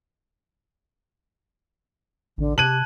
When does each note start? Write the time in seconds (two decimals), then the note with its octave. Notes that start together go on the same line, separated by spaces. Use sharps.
2.38 A1 D3
2.58 C3 G4 A5 F#6 G#6 D#7 F#7